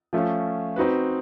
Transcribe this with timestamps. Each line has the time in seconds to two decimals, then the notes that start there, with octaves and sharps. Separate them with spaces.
0.13 F3 A3 C#4 F4
0.76 C4 D#4 F#4 B4